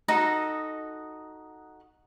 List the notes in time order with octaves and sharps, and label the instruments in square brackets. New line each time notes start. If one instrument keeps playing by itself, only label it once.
[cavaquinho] D#4 F#4 A4 D#5